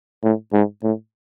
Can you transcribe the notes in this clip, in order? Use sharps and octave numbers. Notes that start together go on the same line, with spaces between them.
A2
G#2
A2